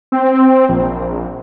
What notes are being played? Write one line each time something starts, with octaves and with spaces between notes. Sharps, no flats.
C4
A#1